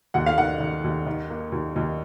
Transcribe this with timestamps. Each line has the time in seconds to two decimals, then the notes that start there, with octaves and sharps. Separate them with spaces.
0.14 D#2 F#5
0.26 F5
0.38 D#3 F#5
0.60 D#3
0.84 D#2
1.06 D#3
1.30 A#3
1.52 D#2
1.76 D#2